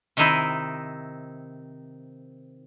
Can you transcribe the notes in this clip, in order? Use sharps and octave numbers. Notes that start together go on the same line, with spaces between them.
C3 D#3 C4 D#4 E4